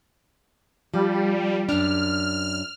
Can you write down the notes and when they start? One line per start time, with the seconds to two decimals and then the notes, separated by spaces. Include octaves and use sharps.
0.94 F3 G3
1.69 F#2 D4 F6